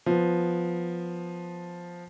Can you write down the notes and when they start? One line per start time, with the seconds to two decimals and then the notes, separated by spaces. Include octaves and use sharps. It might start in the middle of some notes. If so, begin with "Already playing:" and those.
0.06 F3 B3